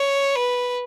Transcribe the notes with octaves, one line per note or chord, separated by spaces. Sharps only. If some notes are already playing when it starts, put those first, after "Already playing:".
Already playing: C#5
B4